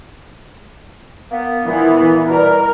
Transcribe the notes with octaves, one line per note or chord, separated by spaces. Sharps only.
A#3 B3
A#2 E3 B3
B2 G3 A#4